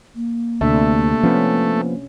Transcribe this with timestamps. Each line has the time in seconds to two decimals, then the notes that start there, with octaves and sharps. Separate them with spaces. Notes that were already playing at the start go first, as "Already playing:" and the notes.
0.15 A#3
0.61 D2 C3 A3 D4 E5
1.23 F3 B3 C#4